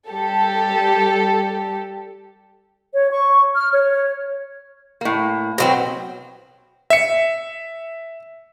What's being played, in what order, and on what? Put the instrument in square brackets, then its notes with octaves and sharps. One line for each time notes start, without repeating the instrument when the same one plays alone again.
[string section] G3 G4 A4
[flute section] C#5
C#6
F6
C#5
[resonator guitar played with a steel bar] A2 A#3
[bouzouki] B2 F#3 C4
[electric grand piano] E5 C#7